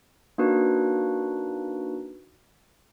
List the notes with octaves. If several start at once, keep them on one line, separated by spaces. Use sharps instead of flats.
A#3 D4 D#4 F#4 B4